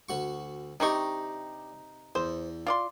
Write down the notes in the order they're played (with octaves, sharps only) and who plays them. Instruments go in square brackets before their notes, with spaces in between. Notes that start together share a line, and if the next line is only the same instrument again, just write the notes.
[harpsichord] D2 F#4 C#6
[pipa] C3 D#4 C#6 [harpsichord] D4 G4
[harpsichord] E2 [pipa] C5
[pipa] F4 D5 C6